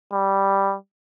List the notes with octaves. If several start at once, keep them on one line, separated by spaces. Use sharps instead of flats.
G3